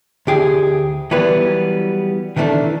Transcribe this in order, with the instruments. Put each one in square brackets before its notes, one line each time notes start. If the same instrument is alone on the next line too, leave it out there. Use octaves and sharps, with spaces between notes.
[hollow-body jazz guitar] D2 G4 G#4
E3 F#3 G3 B3 B4
D#3 E3 A3 C#4 D4